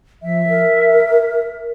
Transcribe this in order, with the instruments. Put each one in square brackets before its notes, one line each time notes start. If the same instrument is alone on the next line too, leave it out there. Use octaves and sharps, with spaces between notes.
[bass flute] F3 [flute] E5
[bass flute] A#4